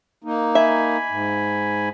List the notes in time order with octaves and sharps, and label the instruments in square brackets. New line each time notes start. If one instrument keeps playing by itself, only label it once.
[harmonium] A#3 D#4
[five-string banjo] E5 [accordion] G#5 B5
[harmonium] G#2